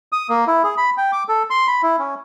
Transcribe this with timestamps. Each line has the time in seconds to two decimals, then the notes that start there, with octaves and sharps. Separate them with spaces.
0.12 D#6
0.29 A#3
0.47 E4
0.64 G#4
0.77 B5
0.98 G5
1.12 D6
1.29 A4
1.50 C6
1.67 B5
1.83 E4
1.99 C#4